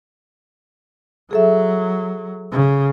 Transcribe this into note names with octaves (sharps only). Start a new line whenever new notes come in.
F#3 G#4 A4 E5
C#3